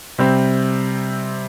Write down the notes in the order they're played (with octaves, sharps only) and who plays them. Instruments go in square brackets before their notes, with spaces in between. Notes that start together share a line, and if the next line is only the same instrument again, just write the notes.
[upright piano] C3 G3 C4